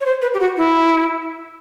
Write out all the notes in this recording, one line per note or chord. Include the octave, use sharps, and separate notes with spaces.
C#5
C5
B4
G4
F#4
E4